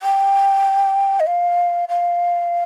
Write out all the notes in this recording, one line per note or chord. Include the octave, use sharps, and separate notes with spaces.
G5
D#5
F5
F5